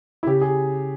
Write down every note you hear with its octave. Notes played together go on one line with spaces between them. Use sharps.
E4
C#3 G4
G#4